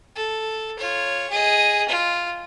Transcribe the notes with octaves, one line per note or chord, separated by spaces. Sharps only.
A4
F4 C#5
G#4 D#5
F4